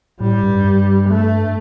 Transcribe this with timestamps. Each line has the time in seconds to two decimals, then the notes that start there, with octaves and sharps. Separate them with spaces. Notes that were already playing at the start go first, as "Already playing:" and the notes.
0.21 A2 G3
0.43 G2
0.65 G2
1.09 A3